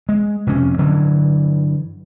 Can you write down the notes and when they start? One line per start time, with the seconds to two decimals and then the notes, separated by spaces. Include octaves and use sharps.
0.09 G#3
0.47 F1 F2 C3 C#4
0.78 G2 D3 E3 F#3